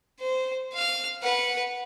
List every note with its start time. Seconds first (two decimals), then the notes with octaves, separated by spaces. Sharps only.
0.20 C5
0.73 F5 F6
1.23 B4 F#5